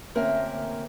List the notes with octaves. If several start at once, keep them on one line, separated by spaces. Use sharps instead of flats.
D2 A#3 C4 C#4 A#4 E5